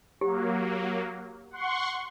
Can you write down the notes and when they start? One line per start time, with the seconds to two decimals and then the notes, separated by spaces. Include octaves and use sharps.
0.21 F#3 A#3 G4
1.51 F#5 C6 C#6